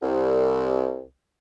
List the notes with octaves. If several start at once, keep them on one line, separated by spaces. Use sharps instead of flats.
C2